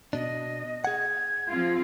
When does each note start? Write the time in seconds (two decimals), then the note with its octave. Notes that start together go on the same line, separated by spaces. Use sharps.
0.13 B2 D4 D#5
0.85 G#4 F#5 G#6
1.50 F3 C4 F4